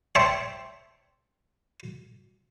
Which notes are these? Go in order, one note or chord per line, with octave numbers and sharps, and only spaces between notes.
C5 C#5 E5 G5 A5